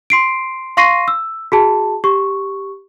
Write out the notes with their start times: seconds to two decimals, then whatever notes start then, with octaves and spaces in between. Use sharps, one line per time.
0.10 C6 C7 D7
0.77 F5 C6 C#6 A#6 C7 D#7
1.08 E6
1.52 F#4 G#4 A5
2.04 G4 C#6